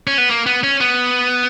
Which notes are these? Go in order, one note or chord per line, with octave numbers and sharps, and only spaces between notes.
C#4
B3
A#3
B3
C#4
B3